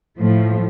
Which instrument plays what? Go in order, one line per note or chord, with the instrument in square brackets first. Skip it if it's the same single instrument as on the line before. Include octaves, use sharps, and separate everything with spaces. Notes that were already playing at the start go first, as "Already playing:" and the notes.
[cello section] A2 F3 A3